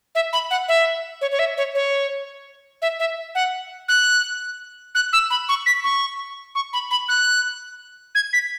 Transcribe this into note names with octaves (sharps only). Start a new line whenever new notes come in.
E5
B5
F#5
E5
C#5
C#5
E5
C#5
C#5
E5
E5
F#5
F#6
F#6
E6
B5
C#6
B6
C#6
C#6
B5
B5
F#6
G#6
B6